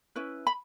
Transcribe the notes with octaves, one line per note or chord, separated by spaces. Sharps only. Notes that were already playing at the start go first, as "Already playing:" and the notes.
C#4 E4 B4
B5